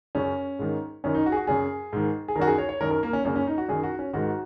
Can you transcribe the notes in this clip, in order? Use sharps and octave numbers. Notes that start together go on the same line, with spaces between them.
F#2 C#3 C#4
G#2 D#3
F#2 D#3 C#4
D#4
F#4
G#4
F#4
F#2 C#3 G#4
G#2 D#3
G#4
F#2 D#3 F#4 A#4
G#4
C#5
C#5
F#2 D#3 A#4
A#4
A#3
C#4
F#2 C#3 A#3
C#4
D#4
F#4
F#2 D#3 G#4
F#4
C#4
G#2 D#3 F#4